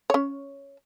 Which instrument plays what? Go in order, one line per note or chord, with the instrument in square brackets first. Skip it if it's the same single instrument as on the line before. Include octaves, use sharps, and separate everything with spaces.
[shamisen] C#4 C#5